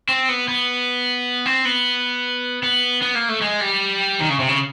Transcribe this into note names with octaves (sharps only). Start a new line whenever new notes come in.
C4
B3
B3
C4
B3
B3
B3
A#3
A3
G#3
G3
D#3
C#3
C3
C#3